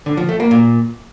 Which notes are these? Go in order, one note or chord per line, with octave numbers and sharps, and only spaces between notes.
D3
F3
A3
A#3
A#2